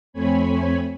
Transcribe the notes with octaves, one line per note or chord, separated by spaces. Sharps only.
F2 A3 C4 C#5 G#5 B5